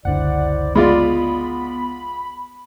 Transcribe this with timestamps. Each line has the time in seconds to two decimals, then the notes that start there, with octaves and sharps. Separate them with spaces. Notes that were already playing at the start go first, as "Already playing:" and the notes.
0.05 F#1 C#2 D3 E4 C5 D5 F#5
0.75 G#3 B3 F4 D5 B5